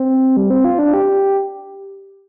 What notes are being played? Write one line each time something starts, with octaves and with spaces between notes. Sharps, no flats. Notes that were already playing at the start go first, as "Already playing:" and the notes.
Already playing: C4
G3
C4
F4
D4
G4